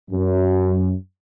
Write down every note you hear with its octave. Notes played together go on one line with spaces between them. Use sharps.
F#2